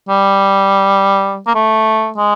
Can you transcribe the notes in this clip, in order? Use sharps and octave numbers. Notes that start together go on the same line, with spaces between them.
G3
A#3
A3
G#3